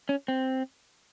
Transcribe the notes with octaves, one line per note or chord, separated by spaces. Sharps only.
C#4
C4